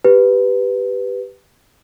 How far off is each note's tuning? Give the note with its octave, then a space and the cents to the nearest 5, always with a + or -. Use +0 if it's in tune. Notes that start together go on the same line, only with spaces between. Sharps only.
G4 +0 B4 +0